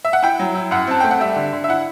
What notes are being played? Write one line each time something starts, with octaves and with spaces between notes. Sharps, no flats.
E5
F#5
E4 G5
F#3
E4
F#2 F#5
C4 A5
A3 G5
F#5
G3 E5
D3
D3
E5
E4 F#5